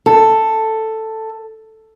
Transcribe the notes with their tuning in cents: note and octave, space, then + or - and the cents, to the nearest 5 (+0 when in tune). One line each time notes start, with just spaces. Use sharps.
A4 +5